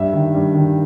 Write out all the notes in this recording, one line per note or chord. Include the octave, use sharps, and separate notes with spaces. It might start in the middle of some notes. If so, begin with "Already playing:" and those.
Already playing: G2 E5
D#3
G2
D#3